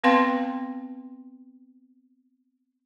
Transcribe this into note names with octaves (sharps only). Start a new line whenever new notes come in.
B3 C4 B4 F5 G5 C6